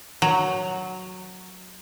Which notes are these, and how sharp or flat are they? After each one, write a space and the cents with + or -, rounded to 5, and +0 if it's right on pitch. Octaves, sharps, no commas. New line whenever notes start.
F#3 +0